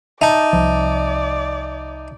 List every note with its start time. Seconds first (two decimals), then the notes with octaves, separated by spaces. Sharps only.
0.22 D#4 D5 E5 A5
0.53 C2 F3